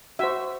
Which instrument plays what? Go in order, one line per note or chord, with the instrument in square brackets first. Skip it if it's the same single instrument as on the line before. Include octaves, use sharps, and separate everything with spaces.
[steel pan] F#4 C5 E5